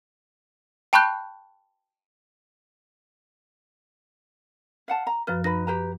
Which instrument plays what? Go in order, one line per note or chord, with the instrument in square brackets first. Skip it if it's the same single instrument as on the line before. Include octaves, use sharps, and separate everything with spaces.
[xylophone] G5 A5 B5 C#6 F#6 G6
[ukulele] F5 F#5 A5
A#5
[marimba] F#2 F3 F6 [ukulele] B4
[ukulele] D#4 B4 B5 [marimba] A#6
[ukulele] G4 B4 A#5